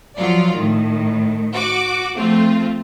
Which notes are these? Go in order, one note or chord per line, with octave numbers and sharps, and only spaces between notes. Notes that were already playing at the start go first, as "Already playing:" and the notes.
F3 F#3 F4 D5
A2 D#3
F#4 D6
F3 A3 C4 F4